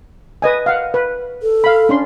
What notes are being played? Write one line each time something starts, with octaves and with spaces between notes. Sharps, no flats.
B4 D#5 G#5
F5 F#5
B4
A4
F5 B5
C#4 D4 C6